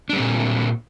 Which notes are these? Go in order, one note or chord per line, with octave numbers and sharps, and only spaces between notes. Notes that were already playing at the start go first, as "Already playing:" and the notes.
A#2 G3 C4 D4